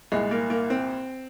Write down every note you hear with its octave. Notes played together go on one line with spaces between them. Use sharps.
C2 A#2 G#3
A#3
A#3
C4